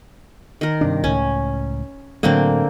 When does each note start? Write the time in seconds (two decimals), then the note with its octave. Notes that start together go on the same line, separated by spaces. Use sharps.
0.61 D#3 A#4
0.81 G2 C3 D4
1.04 C#2 A2 C#4
2.23 A2 D3 F#3 A3 A#3 C4